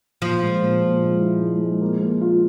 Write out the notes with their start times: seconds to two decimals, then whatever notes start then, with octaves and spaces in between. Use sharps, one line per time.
0.22 A#2 F3
0.42 G#3
0.61 A#2
0.81 A#2
1.02 G#3
1.21 E4
1.42 G#3
1.61 G#3
1.81 A#3
2.01 A#3
2.21 F4